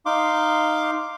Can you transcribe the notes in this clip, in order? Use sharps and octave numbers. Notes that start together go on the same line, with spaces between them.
D#4 F5 C6 D6